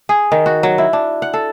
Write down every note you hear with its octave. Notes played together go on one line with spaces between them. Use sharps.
G#4
D#3
F#4
F#3
E4
D4
F#5
A4